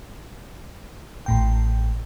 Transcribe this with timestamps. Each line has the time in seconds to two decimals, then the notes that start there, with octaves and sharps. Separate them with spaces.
1.26 A1 A2 G5